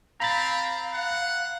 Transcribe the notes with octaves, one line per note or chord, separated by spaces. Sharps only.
C4 F5 A#5 B5 A6
F#5